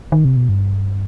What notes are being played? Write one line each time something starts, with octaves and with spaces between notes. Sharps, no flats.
D#3
C3
B2
G2